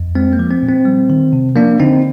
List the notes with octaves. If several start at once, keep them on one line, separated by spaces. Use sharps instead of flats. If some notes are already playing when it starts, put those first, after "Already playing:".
Already playing: F2
G#3 C4
A#3
F3
C4
A#2
C4
G3
D#3
C3
F3 A#3 D4
D3 C4 D#4